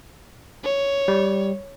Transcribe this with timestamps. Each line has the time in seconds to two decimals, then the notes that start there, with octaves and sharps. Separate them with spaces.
0.64 C#5
1.08 G3